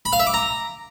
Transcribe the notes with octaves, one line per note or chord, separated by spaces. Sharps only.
B5
F5
E5
D6
A#5